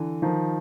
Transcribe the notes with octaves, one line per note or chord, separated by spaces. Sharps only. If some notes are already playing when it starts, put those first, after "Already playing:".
Already playing: D3 E3
D#3 F3